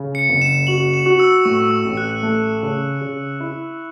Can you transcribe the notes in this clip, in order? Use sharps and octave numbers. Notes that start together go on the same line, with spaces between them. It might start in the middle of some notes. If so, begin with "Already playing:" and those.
Already playing: C#3
C#7
F#1
E7
F#4 F#7
E7
F#4
E6
A2 C#6
E6
A1
F#6
A3
C#3
C#3
E4